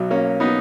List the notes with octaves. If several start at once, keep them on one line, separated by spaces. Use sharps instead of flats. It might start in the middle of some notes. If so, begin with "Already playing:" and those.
Already playing: B1 B2 F#3
A#3 C#4
B3 D#4